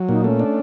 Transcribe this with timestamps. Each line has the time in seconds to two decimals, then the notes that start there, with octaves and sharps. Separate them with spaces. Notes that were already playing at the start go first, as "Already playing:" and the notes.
Already playing: F#3
0.09 A#2 D#4
0.24 A3 C#4
0.39 D4